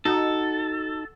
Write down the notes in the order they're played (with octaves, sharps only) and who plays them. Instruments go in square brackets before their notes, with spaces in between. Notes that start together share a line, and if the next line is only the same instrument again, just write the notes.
[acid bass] D#4 [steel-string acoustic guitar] F#4 [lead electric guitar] A4